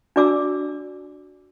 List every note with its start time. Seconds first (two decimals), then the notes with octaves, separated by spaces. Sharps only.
0.16 D4 F#4 D5 D6 E6